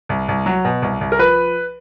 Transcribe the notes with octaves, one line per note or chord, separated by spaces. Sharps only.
C2
C2
F#3
B2
C2
C2
A#4
F3 B4